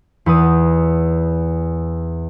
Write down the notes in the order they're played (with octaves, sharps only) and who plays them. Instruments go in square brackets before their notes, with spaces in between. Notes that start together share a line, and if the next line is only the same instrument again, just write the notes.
[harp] E2 B4 D#6